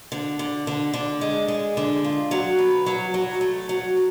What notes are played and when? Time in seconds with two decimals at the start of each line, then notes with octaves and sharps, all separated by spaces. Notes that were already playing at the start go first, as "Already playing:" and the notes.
0.12 D3
0.39 D3
0.67 D3
0.94 D3
1.21 G#3
1.48 G#3
1.77 D3
2.04 F4
2.31 F#3
2.59 B4
2.86 F#3
3.14 F#3
3.41 A3
3.69 F#3